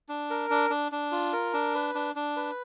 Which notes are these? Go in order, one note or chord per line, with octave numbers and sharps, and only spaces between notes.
D4
A#4
D4
D4
D4
F4
A#4
D4
B4
D4
D4
B4